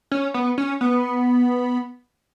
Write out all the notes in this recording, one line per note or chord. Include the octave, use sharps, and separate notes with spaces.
C#4
B3
C#4
B3